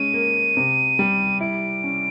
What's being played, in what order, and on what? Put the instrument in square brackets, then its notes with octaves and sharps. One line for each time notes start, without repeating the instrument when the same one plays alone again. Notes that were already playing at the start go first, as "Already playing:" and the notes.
Already playing: [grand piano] G#3 C#4 [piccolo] D#7
[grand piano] A#3
C3
G3
[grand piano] E4 [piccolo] D7
[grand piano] C#4